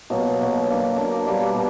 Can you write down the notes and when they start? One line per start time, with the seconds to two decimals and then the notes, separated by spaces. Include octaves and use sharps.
0.10 B2 F#3 A#3
0.40 B2 F#3 A#3
0.68 A#3 D4 A#4
0.97 A#3 D4 A#4
1.26 B2 G3 A#3
1.55 B2